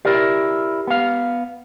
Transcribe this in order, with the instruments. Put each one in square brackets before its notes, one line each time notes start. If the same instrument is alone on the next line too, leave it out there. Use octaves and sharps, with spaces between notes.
[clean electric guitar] E4 A#4 D5 [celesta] G4
[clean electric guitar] B3 F5